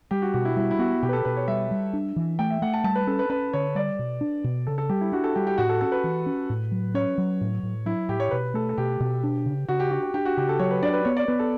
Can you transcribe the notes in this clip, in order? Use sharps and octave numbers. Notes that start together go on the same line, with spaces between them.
G3 G4
F#4
B2 F#4
E4
G3 E4
E4
B3 F#4
B2 G4
B4
A4
B2 B4
C#5
G3 E5
G3
D4
E3
A3 G5
E5
A3 F#5
A5
G3 A5
B4
C#4 A4
B4
C#4 B4
D3 C#5
G3 D5
B2
D4
B2
C#3 A4
A4
G3 G4
E4
D4 F#4
A4
G3 G4
G4
A2 F#4
A4
C#4 A4
B4
E3
C#4
A2
F#3
C#4 C#5
F#3
A2
A2
F#3 E4
A2 G4
C#5
B2 B4
A3 A4
A4
B2 G4
B2
D4
C#3
C#3 F#4
G4
D4 F#4
G4
D4 G4
F#4
C#3 G4
A4
F#3 C#5
B4
D4 D5
B4
B3 C#5
D5
B3 B4
A4